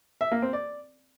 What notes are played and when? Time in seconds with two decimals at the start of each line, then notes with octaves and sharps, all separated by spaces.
0.21 E5
0.32 A#3
0.42 C4
0.53 D5